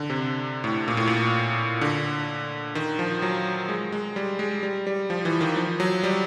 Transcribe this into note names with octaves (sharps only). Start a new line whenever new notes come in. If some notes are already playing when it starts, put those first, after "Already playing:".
Already playing: D3
C3
A2
A#2
A2
A#2
D3
D#3
F3
F#3
G#3
G#3
G3
G#3
G3
G3
F3
E3
D#3
F3
F#3
G3